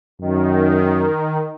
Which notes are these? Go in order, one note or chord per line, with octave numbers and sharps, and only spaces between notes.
F#2 D#3